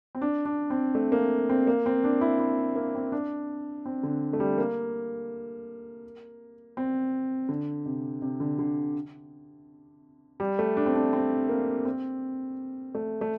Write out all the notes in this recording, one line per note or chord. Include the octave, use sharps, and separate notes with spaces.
C4
D4
D4
C4
A3
A#3
C4
A#3
C4
D4
E4
E4
A#3
C4
D4
C4
D3
A3
G3
A#3
C4
D3
C3
C3
D3
D3
G3
A3
D4
C4
D4
C4
A#3
C4
A3
A3